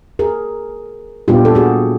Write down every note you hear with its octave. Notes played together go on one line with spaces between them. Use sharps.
G#4 A#4
A#2 G3 B3 D4 F4 G4
A4
F#4 G#4